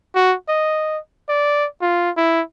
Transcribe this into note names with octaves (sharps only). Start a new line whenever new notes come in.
F#4
D#5
D5
F4
E4